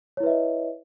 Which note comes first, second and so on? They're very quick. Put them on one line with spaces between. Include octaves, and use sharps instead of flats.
C#5 E4 B4 E5 D#5